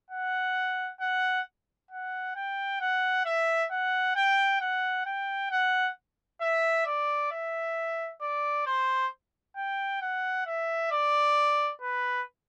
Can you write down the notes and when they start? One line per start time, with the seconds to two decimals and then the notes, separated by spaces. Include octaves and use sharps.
0.10 F#5
1.00 F#5
1.91 F#5
2.36 G5
2.81 F#5
3.26 E5
3.71 F#5
4.16 G5
4.61 F#5
5.06 G5
5.51 F#5
6.41 E5
6.86 D5
7.31 E5
8.21 D5
8.66 C5
9.56 G5
10.02 F#5
10.46 E5
10.91 D5
11.82 B4